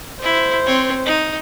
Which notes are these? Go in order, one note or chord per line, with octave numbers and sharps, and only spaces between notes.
E4 C5
C4 C#5
D#4